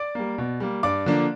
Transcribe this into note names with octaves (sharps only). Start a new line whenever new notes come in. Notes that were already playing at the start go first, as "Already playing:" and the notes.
Already playing: D5 D6
G3 A#3
B2
G3 A#3
G2 D5 D6
D3 F3 A#3 D4